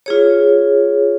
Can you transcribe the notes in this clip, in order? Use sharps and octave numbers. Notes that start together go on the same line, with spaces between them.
F4 G#4 C#5